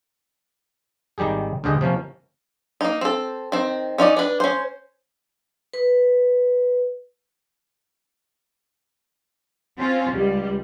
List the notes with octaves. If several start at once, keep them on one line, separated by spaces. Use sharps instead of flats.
G#1 D#3 G3 G4 G#4
D2 G2 D3 G#4 D#5 G5
C3 F3 A#3 C#4
A#3 D#4
C4 A4
D#3 C4
C#4 D#4 F4 D5
D4 B4
C#4 C5
B4
C4 C#4 F4
C#2 G3